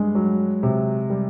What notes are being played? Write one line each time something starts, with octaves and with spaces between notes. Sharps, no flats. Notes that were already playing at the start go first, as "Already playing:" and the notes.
Already playing: G2 G#3
F#3
C3
G3